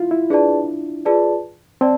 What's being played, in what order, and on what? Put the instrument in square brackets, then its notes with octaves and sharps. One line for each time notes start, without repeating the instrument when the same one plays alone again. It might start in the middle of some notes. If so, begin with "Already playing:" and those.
Already playing: [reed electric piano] E4 F4
E4
[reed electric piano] D4 [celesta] F4 G#4 B4 D5 A5
[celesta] F4 G#4 B4 D5 A5
[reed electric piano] C4 [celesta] D5 A5